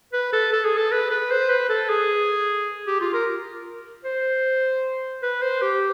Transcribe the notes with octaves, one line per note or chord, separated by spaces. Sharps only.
B4
A4
A4
G#4
A4
B4
B4
C5
B4
A4
G#4
G4
F4
A#4
C5
B4
C5
G4